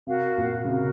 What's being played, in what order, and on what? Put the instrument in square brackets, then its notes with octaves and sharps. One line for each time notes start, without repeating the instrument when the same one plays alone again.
[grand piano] C3 [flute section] F#4 A#4 F5
[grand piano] A#2
C#3
[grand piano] C3 [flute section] F#4 A#4 F5